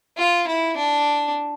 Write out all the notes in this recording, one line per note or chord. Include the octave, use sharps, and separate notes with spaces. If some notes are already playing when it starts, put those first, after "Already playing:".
F4
E4
D4